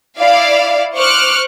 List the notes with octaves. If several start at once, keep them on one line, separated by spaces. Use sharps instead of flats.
E4 D5 F5
C5 C#6 D6 F6 F#6